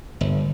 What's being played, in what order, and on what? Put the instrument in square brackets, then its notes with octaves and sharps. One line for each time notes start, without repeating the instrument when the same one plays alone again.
[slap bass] G1